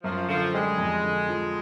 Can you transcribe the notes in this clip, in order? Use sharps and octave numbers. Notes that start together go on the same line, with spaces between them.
F#2 F3
D3 F3
G3 G#3
F2
D3
F3